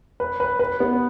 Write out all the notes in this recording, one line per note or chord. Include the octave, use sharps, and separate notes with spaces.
B4
B4
B4
B3